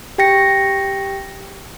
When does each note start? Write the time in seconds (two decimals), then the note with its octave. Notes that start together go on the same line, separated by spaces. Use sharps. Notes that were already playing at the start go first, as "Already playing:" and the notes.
0.18 G4 G5 A#6 C#7